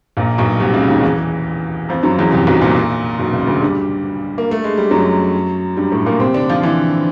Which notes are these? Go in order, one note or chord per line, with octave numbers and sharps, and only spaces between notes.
A#1 A#2
B1 B2
C2 C3
C#2 C#3
D#2 D#3
E2 E3
F2 F3
F#2 F#3
E2 E3
C2 C3
B1 B2
A#1 A#2
B1 B2
C#2 C#3
D2 D3
G2 G3
A#3
A3
G#3
G3
F#2 F#3
G2 G3
A2 A3
A#2 A#3
C3 C4
D3 D4
F3 F4
E3 E4